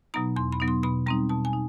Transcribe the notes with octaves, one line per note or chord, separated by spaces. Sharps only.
B2 F#3 B3 D#4 A#5
E2 C6
B5
B2 F#3 B3 D#4
C6
B2 B5
G3 C4 D#4 A#5
B2 A5
G#5
D#4